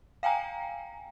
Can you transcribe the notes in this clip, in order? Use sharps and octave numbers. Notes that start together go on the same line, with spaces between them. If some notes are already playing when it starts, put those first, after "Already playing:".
F5 G5 G#5 A#5